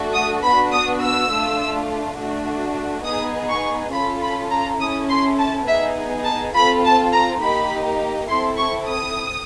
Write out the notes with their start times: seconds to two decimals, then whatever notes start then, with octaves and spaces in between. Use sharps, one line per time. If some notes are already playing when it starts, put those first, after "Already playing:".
Already playing: A3 D4 F#4 A4
0.13 D#6
0.43 B3 D4 F#4 B5
0.72 D#6
1.01 E6
1.30 A3 D4 F4
2.18 A3 D4 F#4
3.05 B3 D#4 G#4 D#6
3.49 C#6
3.92 C#4 F4 A4 B5
4.21 B5
4.51 A#5
4.79 C#4 E4 A4 D#6
5.09 C6
5.38 A5
5.67 B3 D#4 G#4 E5
6.25 A5
6.55 C4 F4 A4 B5
6.84 A5
7.12 A#5
7.41 A#3 D#4 G4 B5
8.29 C4 E4 A4 C6
8.57 C#6
8.88 D#6